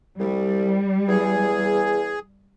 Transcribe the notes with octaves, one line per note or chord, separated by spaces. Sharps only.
C2 G3
E2 G#4